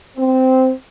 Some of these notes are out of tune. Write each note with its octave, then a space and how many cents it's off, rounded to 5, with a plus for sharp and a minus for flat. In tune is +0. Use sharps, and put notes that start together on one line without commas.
C4 -10